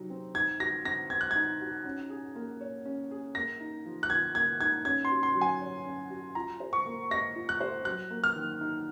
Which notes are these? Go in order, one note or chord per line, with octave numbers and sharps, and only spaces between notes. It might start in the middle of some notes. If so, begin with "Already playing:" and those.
Already playing: C3 F#3 D#4
C4
D#4 G#6
F#4 A#6
C4 A#6
C4 G#6
F#6
D#4 G#6
F#4
C#4
G#4
A#3
C#5
C#4
G#4
A#3 A#6
D#4
F3
F#6
F3 G#6
A#3 G#6
D#4 G#6
C#4 G#6
C6
F#4
C6
F#3
G#5
C#5
C#4
F#4
F4 A#5
C5
C#6
A#3
D#5 A#6
F4
F#6
C5
F#3 F#6
A#3
F6
D#3
D#4